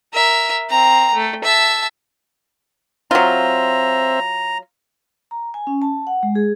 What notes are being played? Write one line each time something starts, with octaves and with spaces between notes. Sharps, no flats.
A#4 E5
C4 A#5
A3
E5 A5
F#3 C4 F4 C5 E5 A#5
A#5
G#5
C#4
A5
F#5
G#3
G#4